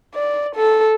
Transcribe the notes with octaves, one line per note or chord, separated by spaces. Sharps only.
D5
A4